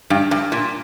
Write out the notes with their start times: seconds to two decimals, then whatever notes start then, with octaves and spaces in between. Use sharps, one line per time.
0.10 G2
0.31 G2
0.52 A#2